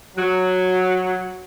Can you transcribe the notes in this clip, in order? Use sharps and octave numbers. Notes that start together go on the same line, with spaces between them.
F#3